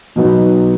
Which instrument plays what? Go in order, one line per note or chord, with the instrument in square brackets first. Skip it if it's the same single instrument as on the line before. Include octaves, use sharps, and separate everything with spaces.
[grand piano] B2 F#3 B3 D#4